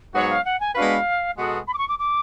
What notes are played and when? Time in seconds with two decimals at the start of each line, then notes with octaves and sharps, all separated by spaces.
0.14 G#2 F#3 B3 F#4 C#5 F#5
0.29 F5
0.45 F#5
0.60 G#5
0.75 G#3 B3 D4 F#4 B4 F5
1.37 B2 G#3 B3 F#4 A4 F#5
1.67 B5
1.73 D6
1.78 C#6
1.88 D6
1.99 D6